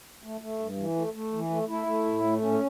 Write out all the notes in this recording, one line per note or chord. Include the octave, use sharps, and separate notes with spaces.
A3
A3
G2
E3
A3
A3
E3
A3
A3 E4
A3
A2
A3
A2 C#4